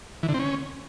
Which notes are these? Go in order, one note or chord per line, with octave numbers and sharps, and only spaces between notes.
E3
D3
C4
C#4